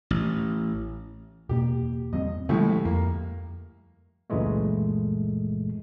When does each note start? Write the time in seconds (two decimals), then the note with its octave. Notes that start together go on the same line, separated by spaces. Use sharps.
0.11 A1
1.49 E1 B2 A#3 G4
2.13 E2 G3 C4 D#5
2.49 C2 A2 D3 F3 G#3
2.85 F2 A#3
4.30 C#2 F#2 A#2 E3 G#3 A3